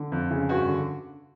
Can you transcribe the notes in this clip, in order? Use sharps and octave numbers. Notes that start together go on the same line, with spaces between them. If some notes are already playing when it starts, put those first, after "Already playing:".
Already playing: D3
F2
C#3
G2 F#4
D3